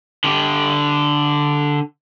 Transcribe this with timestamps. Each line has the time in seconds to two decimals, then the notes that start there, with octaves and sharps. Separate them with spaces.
0.24 D3 G4